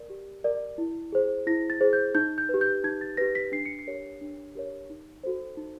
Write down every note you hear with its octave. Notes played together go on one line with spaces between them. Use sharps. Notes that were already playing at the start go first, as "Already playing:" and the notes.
Already playing: A#4 D5
G4
A#4 D5
E4
G#4 C5
E4 A#6
A6
G#4 C5
G6
D#4 G6
G6
G4 B4
G6
D#4 G#6
A6
G4 B4 A#6
B6
D4 C7
C#7
C7
G4 A#4 C#5
D4
G4 A#4 C#5
D#4
F#4 A4 C5
D#4